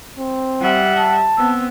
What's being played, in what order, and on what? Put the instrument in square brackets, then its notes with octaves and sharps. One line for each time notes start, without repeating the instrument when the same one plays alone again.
[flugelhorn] C4
[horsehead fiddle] G3 E5 [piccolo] F#5
[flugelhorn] A5
[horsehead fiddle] B3 C4 [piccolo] E6